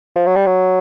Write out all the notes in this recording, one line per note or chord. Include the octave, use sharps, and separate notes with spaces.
F3
F#3
G3
F#3